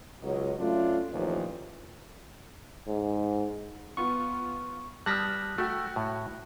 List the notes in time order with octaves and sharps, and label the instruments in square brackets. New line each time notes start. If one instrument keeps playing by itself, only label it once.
[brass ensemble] C#2 F#3 D#5
F#3 A3 C#4 D4 F4
A1 D#2 A#2 F3
[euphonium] G#2
[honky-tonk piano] B3 F4 [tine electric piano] C#6
[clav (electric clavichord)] G3 [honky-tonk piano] A5 D#6 F6 [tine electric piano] F#6 A#6 B6
[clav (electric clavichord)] A3 [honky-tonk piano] F#4 G5 E6
[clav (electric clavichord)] A2